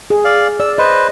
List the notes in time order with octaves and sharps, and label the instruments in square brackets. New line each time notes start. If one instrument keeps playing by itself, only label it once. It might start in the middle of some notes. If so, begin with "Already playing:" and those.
[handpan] G#4
[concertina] D5 F5
[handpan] D5 [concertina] E6
[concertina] B4 C5 [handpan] D#5